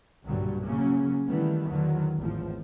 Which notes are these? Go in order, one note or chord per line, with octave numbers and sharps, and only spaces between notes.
B1 G2 A#2 D3 F#3 G3
C#3 F#3 A#3 C#4
D#3 E3 G3 A3 B3
E2 D3 D#3 F#3
G#1 E2 A2 F3